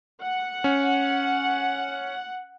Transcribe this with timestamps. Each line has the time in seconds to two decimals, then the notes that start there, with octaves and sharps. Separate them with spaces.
0.22 F#5
0.64 C#4